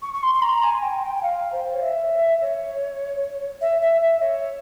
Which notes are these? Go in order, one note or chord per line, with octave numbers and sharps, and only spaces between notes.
C#6
C#6
C6
C6
A#5
G#5
G5
G5
G5
F5
C5
C#5
E5
C#5
E5
E5
E5
C#5